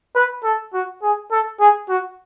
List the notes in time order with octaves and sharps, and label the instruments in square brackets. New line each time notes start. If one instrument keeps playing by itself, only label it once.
[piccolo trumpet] B4
A4
F#4
G#4
A4
G#4
F#4